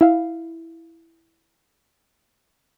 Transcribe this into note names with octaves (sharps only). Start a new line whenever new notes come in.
E4 F5